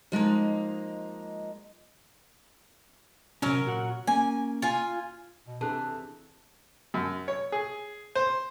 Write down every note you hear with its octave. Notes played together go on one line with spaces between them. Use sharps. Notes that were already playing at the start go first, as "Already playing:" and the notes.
F3 G#3 A#3 D#4
C3 F#3 C#4 A#4
A#2 F#4 F#5
A#3 C#4 G#5
F4 G#5
B2
C3 E3 D4 G#4 A4 A5 F#6
F#2
C#5
G#4
C5